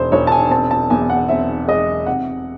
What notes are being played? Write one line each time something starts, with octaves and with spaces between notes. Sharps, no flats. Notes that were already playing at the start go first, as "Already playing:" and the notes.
Already playing: E1 C5
E1 C#5
A5
G#5
C4 A5
A5
E2 G#5
F#5
C4 E5
G#3 D#5
C3 F#5